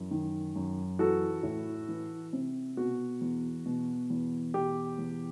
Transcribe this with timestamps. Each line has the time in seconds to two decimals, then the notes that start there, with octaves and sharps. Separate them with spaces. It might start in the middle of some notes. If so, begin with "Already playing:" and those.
Already playing: F#2 E3
0.11 D#3
0.56 F#2
0.99 E3 F#4 A4
1.43 A2
1.88 E3
2.33 C3
2.77 B2 F#4
3.21 E2
3.66 B2
4.10 E2
4.54 B2 G4
4.99 E2